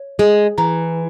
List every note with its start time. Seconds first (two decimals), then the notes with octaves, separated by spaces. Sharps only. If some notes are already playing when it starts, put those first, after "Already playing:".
Already playing: C#5
0.19 G#3 G#4
0.58 E3 A#5